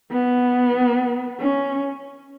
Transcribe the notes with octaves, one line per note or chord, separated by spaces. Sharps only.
B3
C#4